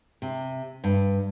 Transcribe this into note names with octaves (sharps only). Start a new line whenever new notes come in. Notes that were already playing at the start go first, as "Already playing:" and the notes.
C3
G2